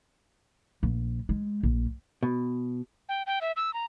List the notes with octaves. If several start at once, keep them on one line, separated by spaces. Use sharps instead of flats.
A#1
G#3
A#1
B2
G5
G5
E5
E6
A#5